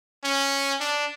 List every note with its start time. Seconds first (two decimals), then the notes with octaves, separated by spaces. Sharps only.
0.24 C#4
0.81 D4